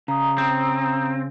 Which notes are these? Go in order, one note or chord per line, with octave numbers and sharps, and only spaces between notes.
C#3 A#5 D#6
C4